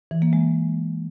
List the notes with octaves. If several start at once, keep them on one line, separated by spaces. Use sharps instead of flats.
E3
A#3
G#3